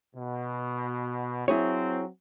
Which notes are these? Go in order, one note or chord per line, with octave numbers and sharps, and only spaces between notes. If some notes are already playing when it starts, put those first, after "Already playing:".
B2
F#3 C4 E4 G#4 C#5